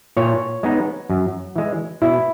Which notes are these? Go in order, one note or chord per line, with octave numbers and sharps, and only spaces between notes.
A#2 C#5
G#3 B3 D#4
F#2
E3 G#3
B2 E4